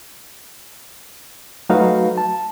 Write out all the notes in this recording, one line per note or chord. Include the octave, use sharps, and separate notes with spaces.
F#3 A3 D#4 F#4 B4 F5
A5